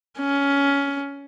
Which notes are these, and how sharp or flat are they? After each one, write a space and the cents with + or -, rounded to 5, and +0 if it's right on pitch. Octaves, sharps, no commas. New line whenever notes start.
C#4 +15